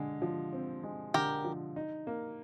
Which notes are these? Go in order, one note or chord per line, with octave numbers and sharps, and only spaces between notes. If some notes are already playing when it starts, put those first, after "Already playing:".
Already playing: D3 G#3
F3
C4
G#3
D3 G4 A#4
F3
D#4
A#3